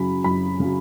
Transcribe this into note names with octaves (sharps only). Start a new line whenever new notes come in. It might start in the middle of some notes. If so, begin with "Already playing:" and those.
Already playing: F#2 C#3 F#3 B5
F#2 B5
C#3 F#3